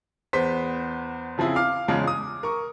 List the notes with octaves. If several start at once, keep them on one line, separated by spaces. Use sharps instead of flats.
E2 B3 C5 B6
C#3 F3 C4 E4 G#4
F5 D6 F6
E2 C#3 F3 G#3
D#6
A#4 C#6